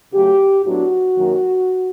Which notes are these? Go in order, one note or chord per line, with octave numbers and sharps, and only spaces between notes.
C#3 F#3 A3 G4
A2 F#3 B3 D4 F#4
F#2 D#3 F#3 A#3